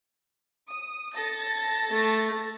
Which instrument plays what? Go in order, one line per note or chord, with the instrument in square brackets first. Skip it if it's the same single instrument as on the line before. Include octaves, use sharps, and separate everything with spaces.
[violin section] D#6
A4 A6 A#6
[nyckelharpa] A3